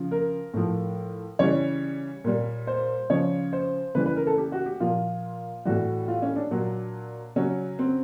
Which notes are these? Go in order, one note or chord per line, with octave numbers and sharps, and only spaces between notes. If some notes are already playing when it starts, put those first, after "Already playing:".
Already playing: C#3 F3
A#4
A2 F3
C#3 E3 G3 C#5
A#2 G3
C5
C#3 F3 C#5
C5
C#3 E3 G3 B4
B4
A#4
A4
G4
F#4
G4
A#2 F3 F4
A2 E3 G3 F#4
F4
C#4
D4
A#2 F#3
C#3 F#3 C#4
C4